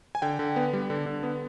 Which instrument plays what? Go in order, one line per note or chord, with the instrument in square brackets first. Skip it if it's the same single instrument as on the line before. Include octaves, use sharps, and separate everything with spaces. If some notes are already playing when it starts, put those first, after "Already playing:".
[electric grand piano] G#5
D3 G5
D3
B3
G3
D3
D3
B3